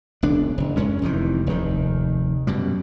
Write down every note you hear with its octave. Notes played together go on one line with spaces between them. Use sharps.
E1 C#2 D4
F#1
F#2 G#3 C#4
F1 C3 D#3 E3
F1 D#2 D#3
F#2 B2 G3